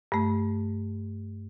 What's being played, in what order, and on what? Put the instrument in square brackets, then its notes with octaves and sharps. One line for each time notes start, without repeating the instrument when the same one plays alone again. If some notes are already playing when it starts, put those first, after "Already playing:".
[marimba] G2 A3